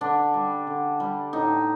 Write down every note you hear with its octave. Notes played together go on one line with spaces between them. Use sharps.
D3 D4
G3
D3
G3
A2 D#4